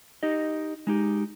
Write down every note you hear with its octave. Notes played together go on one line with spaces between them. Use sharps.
D#4 G4 D#5
G#3 D#4 G4